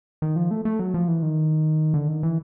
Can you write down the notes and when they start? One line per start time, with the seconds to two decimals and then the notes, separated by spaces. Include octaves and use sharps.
0.22 D#3
0.36 F3
0.51 A3
0.65 A3
0.79 F#3
0.94 F3
1.08 E3
1.22 D#3
1.94 D3
2.08 D#3
2.23 E3